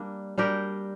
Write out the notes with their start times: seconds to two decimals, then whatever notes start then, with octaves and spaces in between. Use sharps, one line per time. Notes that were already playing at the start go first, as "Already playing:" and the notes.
Already playing: G3 A#3 D4
0.38 G3 D4 G4 A#4